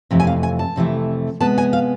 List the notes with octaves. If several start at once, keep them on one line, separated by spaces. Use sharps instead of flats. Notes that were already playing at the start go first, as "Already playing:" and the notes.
F2 C3 E3 A3
G#5
F5
G#5
A5
F2 C3 E3 A3
C3 G#3 B3 A5
G#5
F5